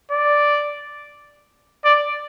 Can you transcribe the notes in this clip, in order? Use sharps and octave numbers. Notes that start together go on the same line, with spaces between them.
D5
D5